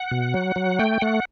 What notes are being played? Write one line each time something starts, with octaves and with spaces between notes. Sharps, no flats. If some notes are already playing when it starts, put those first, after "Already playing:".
Already playing: F#5
B2
F#3
F#3
A3 G5
A3 F#5